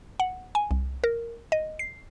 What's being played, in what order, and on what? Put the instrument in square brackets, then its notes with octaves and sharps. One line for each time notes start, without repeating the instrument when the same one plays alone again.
[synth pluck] F#5
G#5
C2
A#4
D#5
C7